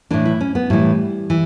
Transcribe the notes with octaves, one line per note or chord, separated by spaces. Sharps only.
A2 E3 D4
E4
C#4
B3
A2 E3 G3
E3